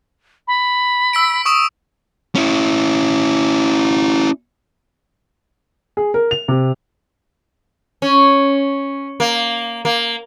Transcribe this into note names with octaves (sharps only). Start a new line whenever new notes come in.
B5
E6 B6 D7
C#6 D#6 D7 E7
C#4 E4
G#4
A#4
F7
C3
C#4
A#3
A#3